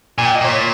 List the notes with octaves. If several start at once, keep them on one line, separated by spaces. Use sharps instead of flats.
A#2 G#5
G5
D#5
A#2 C#5